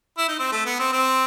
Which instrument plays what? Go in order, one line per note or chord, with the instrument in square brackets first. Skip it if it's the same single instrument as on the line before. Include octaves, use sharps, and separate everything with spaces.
[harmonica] E4
D#4
C4
A3
B3
C4
C4